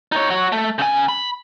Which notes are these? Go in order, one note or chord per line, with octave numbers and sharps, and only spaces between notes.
D#4 C#5
F#4 C#5
A3
C#3 G#5
B5